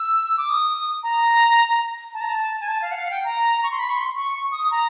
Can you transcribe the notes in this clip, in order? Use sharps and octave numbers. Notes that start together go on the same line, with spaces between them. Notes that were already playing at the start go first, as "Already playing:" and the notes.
Already playing: E6
D6
D#6
A#5
A5
A#5
A5
G#5
A5
F5
F#5
F5
F#5
G5
A#5
C#6
C6
B5
C#6
C6
C#6
C#6
D#6
A#5